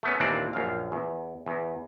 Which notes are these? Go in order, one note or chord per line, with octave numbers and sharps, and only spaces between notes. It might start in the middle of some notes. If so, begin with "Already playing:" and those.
A3 B3 C#4
D#2 A#2 E3 C4 D4 D5
A#1 F#2 F5
E2
E2